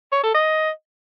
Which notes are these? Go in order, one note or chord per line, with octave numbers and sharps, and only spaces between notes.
C#5
A4
D#5